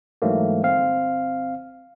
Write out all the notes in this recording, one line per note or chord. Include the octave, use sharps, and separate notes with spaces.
G#2 E3 F#3 A3 A#3
G1 C4 F5